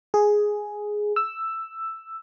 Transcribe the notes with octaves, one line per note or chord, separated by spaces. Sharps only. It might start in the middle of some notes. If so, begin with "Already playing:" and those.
G#4
E6